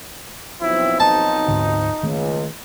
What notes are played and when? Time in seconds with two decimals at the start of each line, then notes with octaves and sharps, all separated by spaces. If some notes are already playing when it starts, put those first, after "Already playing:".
0.61 B1 F3 C4 E4
1.00 D#4 A5
1.48 D2 G#2 D3
2.03 C#2 D#3 A3 A#3